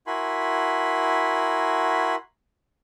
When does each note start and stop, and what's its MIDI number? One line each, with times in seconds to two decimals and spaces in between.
0.07 2.15 64
0.07 2.15 66
0.07 2.15 70
0.07 2.15 80
0.07 2.15 83
0.07 2.15 84